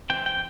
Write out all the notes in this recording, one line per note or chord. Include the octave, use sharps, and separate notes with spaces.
E3 G#3 C4 G5
G5